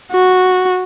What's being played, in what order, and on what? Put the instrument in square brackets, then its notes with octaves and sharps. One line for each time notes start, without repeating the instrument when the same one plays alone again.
[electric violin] F#4